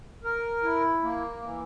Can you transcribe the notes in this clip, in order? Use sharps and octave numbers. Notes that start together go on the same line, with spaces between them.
A#4
E4
A#3
E3